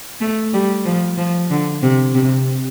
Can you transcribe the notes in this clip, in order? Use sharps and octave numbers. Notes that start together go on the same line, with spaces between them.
A3
G3
F3
F3
D3
C3
C3